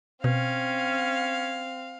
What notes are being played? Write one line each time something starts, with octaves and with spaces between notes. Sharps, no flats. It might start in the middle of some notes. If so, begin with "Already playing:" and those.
B2 C4 C#4 F5